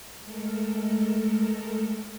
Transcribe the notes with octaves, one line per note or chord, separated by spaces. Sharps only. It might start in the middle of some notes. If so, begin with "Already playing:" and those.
G#3 A3 A4 A#4